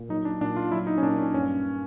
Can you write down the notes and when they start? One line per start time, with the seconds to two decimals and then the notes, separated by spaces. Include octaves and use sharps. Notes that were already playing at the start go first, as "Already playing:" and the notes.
Already playing: A#2
0.09 F#3 D#4
0.25 D4
0.41 A#2 D4
0.56 F4
0.72 F#3 E4
0.87 D#4
0.98 C#4
1.02 A#2 D4
1.18 C#4
1.34 G2 C#4